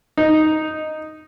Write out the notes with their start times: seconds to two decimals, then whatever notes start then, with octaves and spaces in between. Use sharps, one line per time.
0.17 D#4